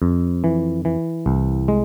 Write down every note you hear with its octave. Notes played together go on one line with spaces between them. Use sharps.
F2
E3
E3
C2
G#3